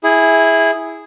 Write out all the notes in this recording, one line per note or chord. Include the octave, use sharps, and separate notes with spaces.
E4 G#4